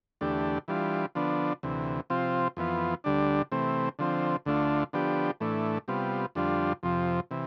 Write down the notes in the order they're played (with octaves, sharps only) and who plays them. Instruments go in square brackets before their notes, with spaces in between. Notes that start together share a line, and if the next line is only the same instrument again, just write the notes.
[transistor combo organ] E2 D3 A3 D4 G4
E3 G3 D4 F4
D3 F3 B3 D4
D2 C3 E3
C3 F3 C4 F4
F2 E3 B3 F4
D2 D3 G3 D4
C3 E3 A3 C4
D3 F3 C4
D2 D3 A3 D4 F4
D3 F3 B3 D4 G4
A2 E3 A3 D4
C3 G3 B3 F4
F2 D3 G3 D4 F4
F2 C3 F3
C3 E3